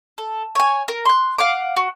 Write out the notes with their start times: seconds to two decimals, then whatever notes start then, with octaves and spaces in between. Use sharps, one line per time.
0.18 A4
0.55 C#5 G#5
0.88 A#4
1.05 C6 F#6
1.38 F5 F#5 D6
1.77 F#4